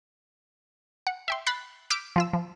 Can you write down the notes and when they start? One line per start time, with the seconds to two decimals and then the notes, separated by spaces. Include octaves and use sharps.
1.07 F#5
1.28 E5 G5 C6
1.47 B5 F#6 A6 B6 C7
1.90 D6 E6 F6 G6 B6 D7
2.16 F3 F4 E6
2.33 F3